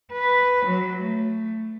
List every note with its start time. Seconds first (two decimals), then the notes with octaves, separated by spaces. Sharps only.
0.12 B4
0.66 F#3
1.02 A3